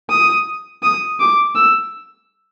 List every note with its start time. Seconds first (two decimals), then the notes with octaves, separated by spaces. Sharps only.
0.10 D#6
0.83 D#6
1.21 D6
1.56 E6